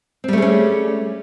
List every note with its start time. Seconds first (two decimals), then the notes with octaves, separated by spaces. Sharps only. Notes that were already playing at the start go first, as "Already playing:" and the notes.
0.24 C4
0.28 G3
0.33 A3
0.38 G#4
0.42 C#4